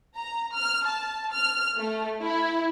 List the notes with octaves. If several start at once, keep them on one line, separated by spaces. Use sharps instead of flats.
A#5
F6
A5
F6
A3
E4